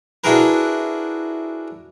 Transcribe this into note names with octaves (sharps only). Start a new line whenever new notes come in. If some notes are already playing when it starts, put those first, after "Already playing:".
D4 E4 F#4 G#4 A#4 B4